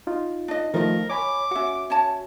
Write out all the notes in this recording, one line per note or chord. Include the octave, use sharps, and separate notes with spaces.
D#4 F4
D4 D#5
D#3 F3 A3 F4 A#4 D#5
C#5 G#5 B5 D6
C#4 F#4 E5 F#5
C#4 C#5 A5